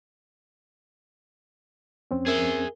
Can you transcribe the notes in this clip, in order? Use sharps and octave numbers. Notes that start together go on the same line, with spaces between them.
F2 C4 C#4
G#4 A#4 E5 G7